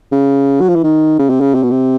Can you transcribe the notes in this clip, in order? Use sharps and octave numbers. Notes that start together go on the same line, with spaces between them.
C#3
F#3
F3
E3
D#3
C#3
C3
C#3
C3
B2
C3